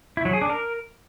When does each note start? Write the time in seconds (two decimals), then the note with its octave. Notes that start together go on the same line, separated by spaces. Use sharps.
0.17 E4
0.25 F#3
0.33 G#4
0.41 D4
0.50 A#4